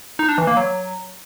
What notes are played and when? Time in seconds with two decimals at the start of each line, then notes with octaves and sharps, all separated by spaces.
0.19 D#4
0.29 D4
0.38 E3
0.47 A#3
0.57 F#3